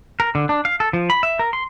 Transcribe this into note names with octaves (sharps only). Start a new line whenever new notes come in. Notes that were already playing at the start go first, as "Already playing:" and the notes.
A#4
D3
D4
F5
A4
F3
B5
E5
A#4
C6